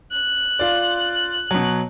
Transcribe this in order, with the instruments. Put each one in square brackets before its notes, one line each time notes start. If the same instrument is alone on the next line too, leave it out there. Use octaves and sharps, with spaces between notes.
[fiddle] F#6
[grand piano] F4 D5
B2 F#3